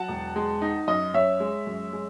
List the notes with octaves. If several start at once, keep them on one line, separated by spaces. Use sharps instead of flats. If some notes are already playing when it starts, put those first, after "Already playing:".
Already playing: F#3 F#5 A5
E1
G#3
D#4
F#2 D#5
F#2 C#5 E5
G#3
F#2
G#3